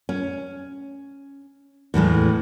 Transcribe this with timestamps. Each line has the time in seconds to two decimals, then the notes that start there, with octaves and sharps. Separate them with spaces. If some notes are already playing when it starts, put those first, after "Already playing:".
0.09 C#4
1.94 E2 A2 E3 G#3